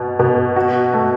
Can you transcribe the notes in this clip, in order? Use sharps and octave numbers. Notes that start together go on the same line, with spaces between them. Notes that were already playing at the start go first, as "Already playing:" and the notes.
Already playing: B2
B2
F#4
A3